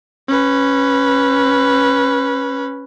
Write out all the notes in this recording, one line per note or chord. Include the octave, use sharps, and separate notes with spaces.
C#4 B4